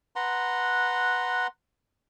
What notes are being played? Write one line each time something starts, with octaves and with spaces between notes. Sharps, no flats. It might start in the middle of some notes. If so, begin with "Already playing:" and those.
B4 F#5 A#5 C6